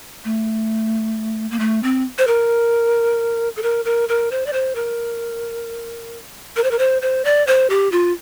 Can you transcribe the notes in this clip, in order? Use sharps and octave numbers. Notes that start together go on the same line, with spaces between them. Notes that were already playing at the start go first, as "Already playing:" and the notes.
A3
A#3
A3
C4
C5
A#4
A4
A#4
A#4
A#4
C5
D5
C5
A#4
A#4
C5
A#4
C5
C5
D5
C5
G4
F4